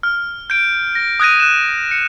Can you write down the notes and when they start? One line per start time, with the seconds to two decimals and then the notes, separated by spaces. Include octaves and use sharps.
0.03 F6
0.50 G6 D7
0.95 A#6
1.20 D#6 F#6 G#6 A#6 D#7
1.40 F#6 E7
1.91 C#7